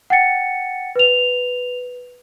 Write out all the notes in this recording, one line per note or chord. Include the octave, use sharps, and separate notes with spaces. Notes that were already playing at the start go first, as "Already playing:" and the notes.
F#5 G5 A6 C#7
B4 F7